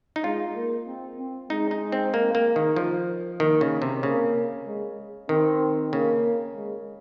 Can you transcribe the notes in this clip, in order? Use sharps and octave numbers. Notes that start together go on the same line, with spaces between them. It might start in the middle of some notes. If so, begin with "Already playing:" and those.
D#4
G#3 F4
A#3
C4
C4
G#3 D#4
D#4
C4
A#3
A#3
D#3
F3
D#3 A#3
C#3
C3
C#3 A#3
G#3
D#3 C4
C#3 A#3
G#3